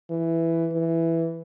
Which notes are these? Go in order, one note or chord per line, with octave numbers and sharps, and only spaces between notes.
E3
E3